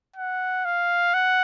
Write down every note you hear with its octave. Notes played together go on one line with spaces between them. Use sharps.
F#5
F5
F#5